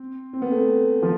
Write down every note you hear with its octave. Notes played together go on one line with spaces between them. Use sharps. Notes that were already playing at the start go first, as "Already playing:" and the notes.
Already playing: C4
C4
B3
A3
F3